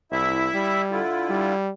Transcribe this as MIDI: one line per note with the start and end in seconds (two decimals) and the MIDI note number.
0.12 0.49 36
0.12 0.81 64
0.12 0.81 76
0.54 1.00 55
0.91 1.54 50
0.91 1.54 64
0.91 1.54 65
1.30 1.71 55